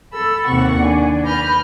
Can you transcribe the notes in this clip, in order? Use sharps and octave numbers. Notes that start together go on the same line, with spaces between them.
A4 B5 E6
D#2 C3 F#5 C#6
D4 G#5
B4 B5 F6 G6 A#6